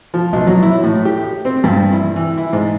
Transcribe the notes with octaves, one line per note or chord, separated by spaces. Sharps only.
F3
B1
F#3
E4
A2
G4
C4
G2
E4
E3
E4
G#2